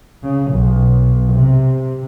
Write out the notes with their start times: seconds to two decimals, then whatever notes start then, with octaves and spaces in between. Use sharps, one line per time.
0.23 C#3
0.52 B1
1.32 C3